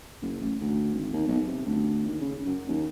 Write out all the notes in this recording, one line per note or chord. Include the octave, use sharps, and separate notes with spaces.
F#1
A1
D2
G#1
D#2
B1
C3
D2
D#2
C#3
F#2
D#2